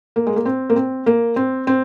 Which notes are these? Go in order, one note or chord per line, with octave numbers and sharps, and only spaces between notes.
A#3
G#3
A#3
C4
A#3
C4
A#3
C4
C4